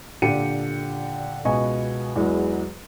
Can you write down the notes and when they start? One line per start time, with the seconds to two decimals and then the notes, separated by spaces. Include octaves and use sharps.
0.22 A#2 D3 G4 G5 C#7 D#7
1.45 C#2 B2 B3 D#5 G#5 C#6
2.16 E2 E3 F#3 G#3